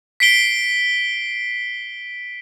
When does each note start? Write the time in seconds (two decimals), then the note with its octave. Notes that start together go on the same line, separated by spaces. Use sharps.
0.20 B6 C7 D7 G7